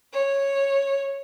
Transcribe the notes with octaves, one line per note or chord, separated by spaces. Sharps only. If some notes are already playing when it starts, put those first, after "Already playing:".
C#5